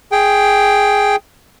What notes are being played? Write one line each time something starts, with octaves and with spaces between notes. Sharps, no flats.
G#4 G5